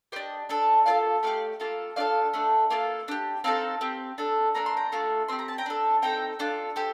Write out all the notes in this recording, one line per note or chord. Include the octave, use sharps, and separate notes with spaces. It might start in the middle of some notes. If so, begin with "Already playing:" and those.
D4 G4 C5 D#5
D4 A4
A#3 F4 A4 D5 F5
A3 D#4 G4 D5 F5
A#3 F4 A4
D4 F4 A4 D5 F5
A3 D4 A4
A#3 F4 A4
D4 G4
C4 D#4 A4 F5 A5
C4 G4
D4 A4
A#3 D4 A4 A#5
C6
G5 A#5
A3 D4 F4 A4
C4 G4 C6
A#5
A5
G5 A#5
D4 A4
C4 D#4 A4 G5 A#5
D4 F4 A4
G4 A4 C5